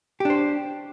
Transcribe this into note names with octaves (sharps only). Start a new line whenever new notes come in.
D4 G4 C5